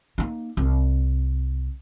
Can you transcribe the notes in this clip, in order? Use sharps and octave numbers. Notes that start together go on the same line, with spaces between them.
A#3 D#4
C2